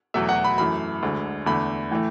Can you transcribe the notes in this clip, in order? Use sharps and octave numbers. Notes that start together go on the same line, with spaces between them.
E2 B2 F#3 A3 E5
F#5
B5
F#2 E3 A3 B5
D2 D3 G#3
E2 D3 A3 B5
A2 E3 A3